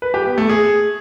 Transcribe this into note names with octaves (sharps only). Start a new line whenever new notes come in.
B4
G4
B3
A3
G#4